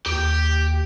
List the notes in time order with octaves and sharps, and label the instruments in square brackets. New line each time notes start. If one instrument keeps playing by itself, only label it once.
[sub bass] D#2 [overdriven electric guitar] G4 G5